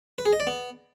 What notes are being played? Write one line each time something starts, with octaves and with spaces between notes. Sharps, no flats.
B4
G#4
D#5
D5
B3